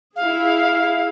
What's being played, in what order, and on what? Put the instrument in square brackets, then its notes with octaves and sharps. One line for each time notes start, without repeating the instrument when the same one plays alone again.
[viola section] E4 G#4 [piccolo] F5